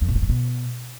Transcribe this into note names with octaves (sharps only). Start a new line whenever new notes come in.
F2
B2
A2
G2
B2